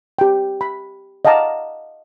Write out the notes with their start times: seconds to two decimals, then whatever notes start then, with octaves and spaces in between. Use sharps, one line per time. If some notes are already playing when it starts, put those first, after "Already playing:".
0.19 G4 G5
0.61 B5
1.25 D#5 F5 F#5 A5 A#5 D6